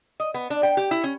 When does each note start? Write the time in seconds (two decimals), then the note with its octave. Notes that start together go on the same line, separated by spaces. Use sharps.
0.20 D#5
0.34 B3
0.50 D4
0.63 G5
0.77 G4
0.91 E4
1.04 C#4